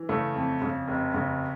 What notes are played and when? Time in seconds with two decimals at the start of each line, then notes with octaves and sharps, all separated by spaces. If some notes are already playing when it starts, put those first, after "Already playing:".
Already playing: E3
0.09 C#3 A3 A4
0.35 F2
0.62 C#3
0.88 F1
1.14 C#3